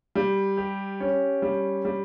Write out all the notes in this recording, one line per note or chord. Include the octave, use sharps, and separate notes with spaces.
G3
G4
C#4
G3
G3